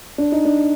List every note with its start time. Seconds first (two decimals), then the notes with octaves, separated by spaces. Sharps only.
0.18 D4
0.32 D#4
0.45 D4